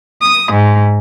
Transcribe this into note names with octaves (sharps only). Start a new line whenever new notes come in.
D#6
G#2